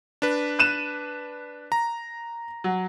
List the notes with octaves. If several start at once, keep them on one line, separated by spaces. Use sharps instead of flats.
D4 B4
F#6 D#7 E7
A#5
F#3